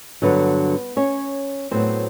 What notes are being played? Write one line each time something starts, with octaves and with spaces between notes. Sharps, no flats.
G2 D3 F#3 B3 B4
C#4 C#5
A2 F#3 B3 C4 C5